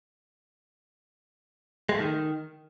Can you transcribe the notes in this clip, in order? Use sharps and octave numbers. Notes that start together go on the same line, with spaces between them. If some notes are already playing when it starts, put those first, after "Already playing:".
G#3
A3
D#3